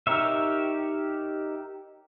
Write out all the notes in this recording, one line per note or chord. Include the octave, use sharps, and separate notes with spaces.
D#4 G4 A#4 C#5 E5